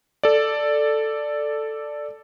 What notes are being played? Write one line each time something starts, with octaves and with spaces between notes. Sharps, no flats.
A4 D5